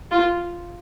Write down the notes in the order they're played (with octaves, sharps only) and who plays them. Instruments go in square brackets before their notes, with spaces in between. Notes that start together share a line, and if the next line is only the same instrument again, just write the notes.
[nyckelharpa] F4